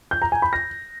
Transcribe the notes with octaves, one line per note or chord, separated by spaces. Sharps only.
G6
A#5
G#5
B5
A#6